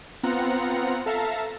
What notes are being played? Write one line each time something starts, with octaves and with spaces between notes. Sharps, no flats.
B3 C4 F4 F#5 A#5 C#7
A4 E5 F5 A5 A#5